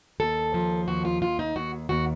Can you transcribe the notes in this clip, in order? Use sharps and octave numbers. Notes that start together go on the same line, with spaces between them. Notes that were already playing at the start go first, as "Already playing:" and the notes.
D#2 A4
F3
D#2 F#4
F4
D#2 F4
D#4
D#2 F#4
D#2 F#4